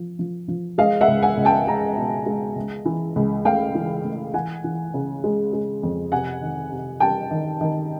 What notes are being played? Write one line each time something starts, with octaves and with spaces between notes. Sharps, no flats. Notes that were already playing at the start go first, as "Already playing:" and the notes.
Already playing: F3
F3
F3
G#3 D#5 F5
E5 F#5
C#2
F#5 G#5
C#2
G5 A5
G#3 G#5 A#5
B2
G#3
C#2
E3
C#2
A3 F5 G5
E3
A3
E3 F#5 G#5
E3
C#3
G#3
G#3
F2
C3 F#5 G#5
D#3
C3
G3 G5 A5
D#3
D#3